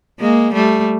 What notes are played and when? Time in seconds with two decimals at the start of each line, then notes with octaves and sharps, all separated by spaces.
0.20 G#3 A#3
0.53 G3 A3